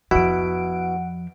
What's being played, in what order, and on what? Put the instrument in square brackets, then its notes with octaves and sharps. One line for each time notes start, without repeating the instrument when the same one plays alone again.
[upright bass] F2 F3 [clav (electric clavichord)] B2 E4 [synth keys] F#4 D7 [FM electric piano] F#5